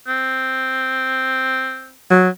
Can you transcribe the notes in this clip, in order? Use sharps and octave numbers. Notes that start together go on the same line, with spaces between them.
C4
F#3